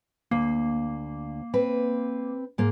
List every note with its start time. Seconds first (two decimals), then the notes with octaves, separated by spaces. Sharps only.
0.31 D2 A#3
1.54 C4 B4
2.58 G#2 A#3